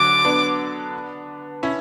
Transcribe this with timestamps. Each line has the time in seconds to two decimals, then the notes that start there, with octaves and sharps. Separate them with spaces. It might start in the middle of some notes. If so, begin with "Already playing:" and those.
Already playing: D3 F#3 D6
0.25 B3 D4
1.63 C#4 E4